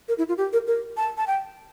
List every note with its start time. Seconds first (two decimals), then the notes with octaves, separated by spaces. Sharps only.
0.08 A#4
0.18 E4
0.28 F4
0.38 G4
0.53 A#4
0.67 A#4
0.97 A5
1.17 A5
1.27 G5